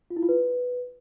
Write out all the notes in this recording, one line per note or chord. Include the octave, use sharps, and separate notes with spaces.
F4
E4
F4
B4